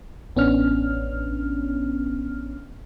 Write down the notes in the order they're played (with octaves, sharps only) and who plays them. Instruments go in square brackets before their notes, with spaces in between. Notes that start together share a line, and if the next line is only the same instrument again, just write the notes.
[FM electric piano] A1 B3 C#4 D4 F6